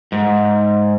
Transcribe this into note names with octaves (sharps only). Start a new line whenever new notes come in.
G#2